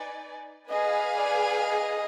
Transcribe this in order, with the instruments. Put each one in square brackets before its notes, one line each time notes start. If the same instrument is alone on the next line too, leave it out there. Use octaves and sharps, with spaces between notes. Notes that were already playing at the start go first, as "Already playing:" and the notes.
Already playing: [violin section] D#4 B4 D5 G#5
[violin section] G#4 B4 F5 G#5 [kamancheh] D#5
[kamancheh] D5
D#5